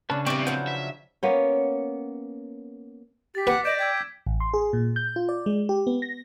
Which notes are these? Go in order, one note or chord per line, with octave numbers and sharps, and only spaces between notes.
C#3 D4 B4 A5
E3 G3 B3 C4 G5 C#6 D6
F3 F#3 B4 F#5 G6
E5
A#3 B3 C#4
G4 A6 B6
B4 F#5 D6
D5 D#5 G6 D7 E7
G5 E6 G#6 B6
A1
C6
G#4
A#2
G6
F4
D5
G#3
G4
B3
A#6